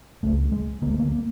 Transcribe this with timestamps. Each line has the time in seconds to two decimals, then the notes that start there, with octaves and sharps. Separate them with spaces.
0.23 C#2 C#3 A3
0.52 G#3
0.82 D3 A#3
0.86 D2 A3
0.99 A#3
1.12 A#3